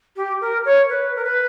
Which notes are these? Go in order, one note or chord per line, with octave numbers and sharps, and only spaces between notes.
G4
A#4
C#5
B4
A#4
B4